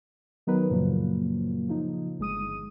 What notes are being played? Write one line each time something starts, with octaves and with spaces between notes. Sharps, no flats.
D#3 F#3 B3 D#4 A#4 B4
F#2 A#2 C#3 F3 F#3 A#3
C#3 F3 D#4
G1 G#3 D#6 D#7